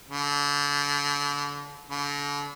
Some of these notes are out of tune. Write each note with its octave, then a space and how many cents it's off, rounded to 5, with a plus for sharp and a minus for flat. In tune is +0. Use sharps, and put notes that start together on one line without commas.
D3 -35
D3 -40